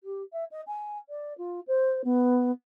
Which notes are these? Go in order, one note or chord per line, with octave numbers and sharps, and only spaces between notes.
G4
E5
D#5
G#5
D5
F4
C5
B3